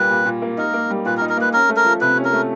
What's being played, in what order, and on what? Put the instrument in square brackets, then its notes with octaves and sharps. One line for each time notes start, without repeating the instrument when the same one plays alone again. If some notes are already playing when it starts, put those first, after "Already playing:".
Already playing: [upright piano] A#2 G3 A#3 [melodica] B4
[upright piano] A#2
A#2
A#3
[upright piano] D#4 [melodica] A#4
[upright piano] A#3
G3
[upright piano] A#2 [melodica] B4
[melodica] A#4
[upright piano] D#4
[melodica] A#4
[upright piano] A#3 [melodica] B4
[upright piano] C#4 [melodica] A#4
[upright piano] A3
[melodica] A#4
[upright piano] F3
[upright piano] C3 [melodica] B4
[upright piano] C#4
[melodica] A#4
[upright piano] A3